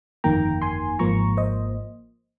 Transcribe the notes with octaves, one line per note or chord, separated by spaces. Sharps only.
G1 F2 D#3 A#3 G5 A#5
G#5 C6
G#1 G#2 F3 A#3 A#5 C#6
C5 D#5